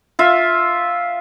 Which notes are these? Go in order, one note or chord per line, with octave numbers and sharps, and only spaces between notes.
F4 E5